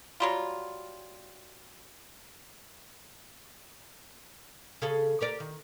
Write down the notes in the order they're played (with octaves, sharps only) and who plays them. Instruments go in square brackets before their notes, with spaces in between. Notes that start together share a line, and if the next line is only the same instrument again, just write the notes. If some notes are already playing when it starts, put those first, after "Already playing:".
[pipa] F#3 G3 F4
[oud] C#3 G#4 A4
G4 A#4 D5
D#3